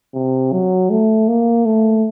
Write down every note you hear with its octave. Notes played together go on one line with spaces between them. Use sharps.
C3
F#3
A3
A#3
A3